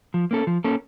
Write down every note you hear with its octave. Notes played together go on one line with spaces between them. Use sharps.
F3
A#3 C#4 A4
F3
A#3 C#4 A4